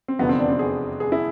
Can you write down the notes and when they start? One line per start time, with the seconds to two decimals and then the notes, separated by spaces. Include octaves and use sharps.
0.08 C4
0.19 F1 E2 D3 F3 B3
0.29 C4
0.39 D4
0.49 C4
0.59 G#4
1.00 G#4
1.12 E4